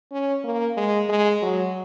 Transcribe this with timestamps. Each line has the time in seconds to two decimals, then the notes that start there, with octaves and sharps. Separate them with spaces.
0.11 C#4
0.44 A#3
0.77 G#3
1.09 G#3
1.42 F#3